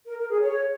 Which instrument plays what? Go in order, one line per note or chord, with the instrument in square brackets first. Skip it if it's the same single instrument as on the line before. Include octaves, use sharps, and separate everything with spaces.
[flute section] A#4
A#4
G#4
C#5